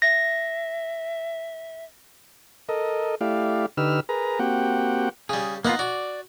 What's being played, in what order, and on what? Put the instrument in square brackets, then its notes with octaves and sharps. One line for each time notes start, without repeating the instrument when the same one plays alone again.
[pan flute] E5 [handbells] A#6
[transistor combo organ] A4 A#4 D#5
A3 E4 G4 D5 F5
D3 D#4 G4 B4 E6 F6
G#4 A#4 B4 A#5
A#3 C4 F#4 G4 F#5 G5
[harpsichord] C#3 G3 [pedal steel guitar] G#4
[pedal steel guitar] A#3 B3 F4 [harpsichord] D#4 F#5 A#5
[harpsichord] F#4 [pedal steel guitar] D5